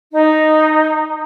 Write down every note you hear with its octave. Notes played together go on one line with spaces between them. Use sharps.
D#4